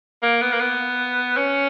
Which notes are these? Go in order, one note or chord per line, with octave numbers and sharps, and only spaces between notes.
A#3
B3
A#3
B3
C#4